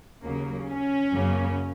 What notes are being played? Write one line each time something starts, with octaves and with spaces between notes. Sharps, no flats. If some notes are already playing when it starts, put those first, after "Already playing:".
D#2 C#3 F#3 A#3
C#4
F#2 C#3 F#3 A#3